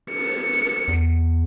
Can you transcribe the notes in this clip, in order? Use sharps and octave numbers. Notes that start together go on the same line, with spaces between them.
C#7
E2